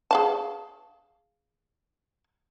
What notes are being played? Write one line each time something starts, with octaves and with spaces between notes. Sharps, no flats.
G#4 F5 A5